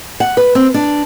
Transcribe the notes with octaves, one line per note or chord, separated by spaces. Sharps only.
F#5
B4
C4
D4